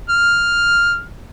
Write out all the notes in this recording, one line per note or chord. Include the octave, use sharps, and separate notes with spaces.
F6